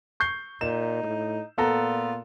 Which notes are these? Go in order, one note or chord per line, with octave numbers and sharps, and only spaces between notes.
C#6 G6 C7
A#2 D#4 E7
A2
A#2 B3 F4 A4 A#5